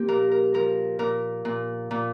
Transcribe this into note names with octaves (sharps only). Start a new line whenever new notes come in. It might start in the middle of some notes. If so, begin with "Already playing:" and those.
Already playing: F3 A#3 G4
A#2 A#4
A#4
F3 A#4
A#2 A#4
A#2
A#2